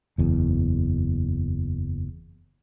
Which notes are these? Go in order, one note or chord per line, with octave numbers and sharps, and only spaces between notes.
F#1 E2